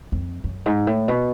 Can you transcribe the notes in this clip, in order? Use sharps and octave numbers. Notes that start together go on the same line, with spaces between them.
F2
F#2
G#2
A2
B2